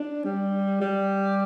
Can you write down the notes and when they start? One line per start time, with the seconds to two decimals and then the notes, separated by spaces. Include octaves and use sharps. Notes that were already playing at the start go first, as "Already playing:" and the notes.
Already playing: D4
0.24 G3
0.81 G3